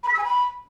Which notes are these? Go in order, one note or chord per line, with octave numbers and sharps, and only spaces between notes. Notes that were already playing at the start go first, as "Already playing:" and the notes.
B5
B6
E6
G#5
B5